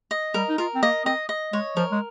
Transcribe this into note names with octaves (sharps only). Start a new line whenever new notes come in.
D#5
G3 A#4
D#4
F4 A#4
C4
A#3 D#5
C4 D#5
D#5
G#3 C#5
F3 A#4
G#3